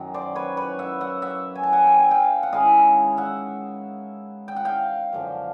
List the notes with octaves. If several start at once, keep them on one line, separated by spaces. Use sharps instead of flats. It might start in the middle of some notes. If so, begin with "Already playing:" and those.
Already playing: F#2 D#3 F#3
C5 D5
B4 C#5
B4 C#5
E5 F#5
E5 F#5
E5 F#5
G#5
A5
F#5 G#5
G5
G#5
F5 G5
F#5
D#3 G#3 C#4 E4 D#5 F5
E5 F#5
G5
F#5
F5 G5
F#2 D3 F3